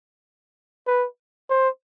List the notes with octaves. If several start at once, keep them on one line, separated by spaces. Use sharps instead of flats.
B4
C5